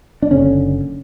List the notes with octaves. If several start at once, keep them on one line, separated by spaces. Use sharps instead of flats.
D4
F#1 F#2 D3 C#4